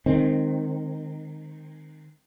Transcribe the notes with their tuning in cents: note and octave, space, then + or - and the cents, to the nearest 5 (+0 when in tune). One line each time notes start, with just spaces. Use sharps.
D#3 -15 G#3 +0 C4 +0